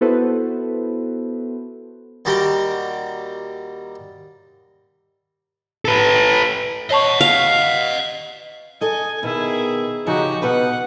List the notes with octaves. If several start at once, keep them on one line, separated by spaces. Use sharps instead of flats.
B3 E4 F#4 A4 B4 C5
D#2 G3 F#4 G4 A#4 G5
A4 B4
C#5 D#5 F#5 A5 C#6
F5
A4 D#5 G#5
B2 D#3 E4 G#4
C#3 F3 D#4 F#4 G4
B2 B3 D#4 B4 F#5